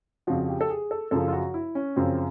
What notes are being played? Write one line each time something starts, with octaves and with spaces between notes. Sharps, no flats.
F2 C#3 F3 F#4
G4
A4
G#4
A4
F#2 C#3 F3 A4
F4
F#4
E4
C#4
F#2 C#3 F3 C4